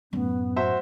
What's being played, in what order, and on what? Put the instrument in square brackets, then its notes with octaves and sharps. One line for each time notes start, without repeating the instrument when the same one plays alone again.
[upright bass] F#2 A2 [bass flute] B3
[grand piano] F#4 C5 E5